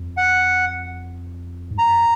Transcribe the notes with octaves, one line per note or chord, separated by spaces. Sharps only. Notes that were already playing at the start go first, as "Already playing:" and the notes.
Already playing: F2
F#5
G#2
F#2 A#5